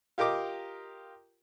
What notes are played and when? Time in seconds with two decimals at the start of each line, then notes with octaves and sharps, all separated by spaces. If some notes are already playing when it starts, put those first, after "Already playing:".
0.18 F4 G4 A#4 D#5 D6